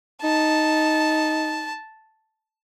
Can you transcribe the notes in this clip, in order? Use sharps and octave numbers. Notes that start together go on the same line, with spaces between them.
D#4 A5